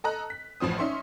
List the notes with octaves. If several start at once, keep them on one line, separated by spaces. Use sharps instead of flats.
A4 D#5 A#5 F#6
B6
A1 A2 F3 C5 D#6
C#4 D#4 E5 C6 C#6